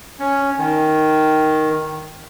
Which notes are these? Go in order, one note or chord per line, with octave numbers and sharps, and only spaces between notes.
C#4
D#3